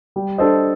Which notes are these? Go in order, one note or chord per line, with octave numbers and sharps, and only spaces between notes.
G3
D4 A4 C5 D#5